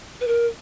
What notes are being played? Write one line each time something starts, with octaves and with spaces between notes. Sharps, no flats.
B4
A#4